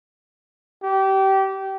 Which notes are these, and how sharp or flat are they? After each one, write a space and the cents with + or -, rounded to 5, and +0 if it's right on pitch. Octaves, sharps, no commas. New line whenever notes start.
G4 -25